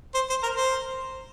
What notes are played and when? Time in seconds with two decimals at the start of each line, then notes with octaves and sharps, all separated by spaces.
0.14 C5
0.30 C5
0.43 A#4
0.57 C5